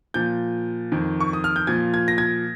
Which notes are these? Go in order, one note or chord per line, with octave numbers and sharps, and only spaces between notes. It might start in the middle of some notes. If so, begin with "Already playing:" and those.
A#2 F3 G6
F2 D#3
C#6
D#6
F6
G6
A#2 F3 G#6
G#6
A#6
G#6